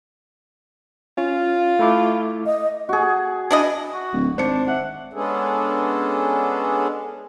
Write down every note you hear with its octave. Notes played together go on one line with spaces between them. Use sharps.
C#4 F4
A3 E4 D6
D#5
F#4 G#4
D4 E4 D#5
F#4
D1
G#1 D4 C5 C#7
E5 F#5
G#3 B3 C#4 D4 G#4 A4